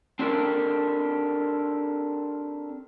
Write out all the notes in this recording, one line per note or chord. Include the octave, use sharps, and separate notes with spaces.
C4 D4 D#4 G4 A4 A#4